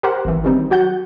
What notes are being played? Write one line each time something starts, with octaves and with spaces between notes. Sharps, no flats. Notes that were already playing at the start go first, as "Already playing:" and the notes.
G4 A#4 C5 F#5
G#1 E3
D#3 G3 C4 D#4
F#3 F#4 F#5 G6